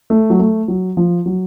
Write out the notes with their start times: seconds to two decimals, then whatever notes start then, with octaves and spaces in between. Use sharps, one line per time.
0.10 A3
0.30 F#3
0.39 A3
0.68 F#3
0.97 F3
1.26 F#3